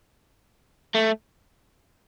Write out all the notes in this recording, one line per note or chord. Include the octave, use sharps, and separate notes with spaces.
A3